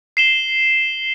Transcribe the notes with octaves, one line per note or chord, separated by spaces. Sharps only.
C7 E7 G7